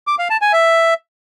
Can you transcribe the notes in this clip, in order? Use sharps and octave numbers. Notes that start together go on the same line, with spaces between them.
D6
F5
A5
G#5
E5